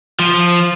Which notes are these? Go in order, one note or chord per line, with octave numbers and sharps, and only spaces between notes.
F3